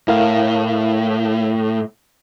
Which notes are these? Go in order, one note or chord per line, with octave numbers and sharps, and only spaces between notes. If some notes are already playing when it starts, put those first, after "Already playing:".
A2 E4 A#4 F5